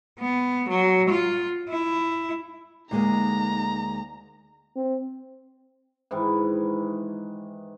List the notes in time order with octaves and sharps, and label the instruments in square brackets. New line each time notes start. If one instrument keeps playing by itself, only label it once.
[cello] B3
F#3
F4
E4
[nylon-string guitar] D2 G#3 A#3 [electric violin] D#4 A#5
[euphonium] C4
[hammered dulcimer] G#2 D#3 E3